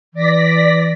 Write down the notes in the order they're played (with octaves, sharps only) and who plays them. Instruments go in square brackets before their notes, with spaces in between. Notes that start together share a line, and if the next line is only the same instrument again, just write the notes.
[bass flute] E3 [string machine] D5 A#6 B6